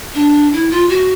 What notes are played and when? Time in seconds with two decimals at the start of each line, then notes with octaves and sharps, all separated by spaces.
0.15 D4
0.53 E4
0.70 F4
0.89 F#4